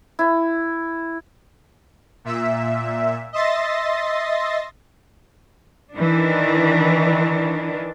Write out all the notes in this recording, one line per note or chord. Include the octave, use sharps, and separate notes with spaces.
E4
A#2 E5
D#5 E5 C6 A6 A#6
D#3 E3 D4